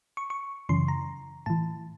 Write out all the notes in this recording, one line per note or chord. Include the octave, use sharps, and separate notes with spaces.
C#6
C#6
F#2 C#3 E3 C6
A#5
A2 E3 A5